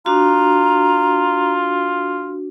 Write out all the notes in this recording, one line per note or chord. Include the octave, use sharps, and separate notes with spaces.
D4 F4 F#4 A#5